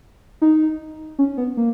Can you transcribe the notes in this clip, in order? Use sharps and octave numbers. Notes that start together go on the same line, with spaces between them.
D#4
C#4
B3
A#3